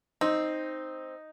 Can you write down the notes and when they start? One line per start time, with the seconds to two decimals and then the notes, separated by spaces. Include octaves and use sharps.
0.21 C4 D#4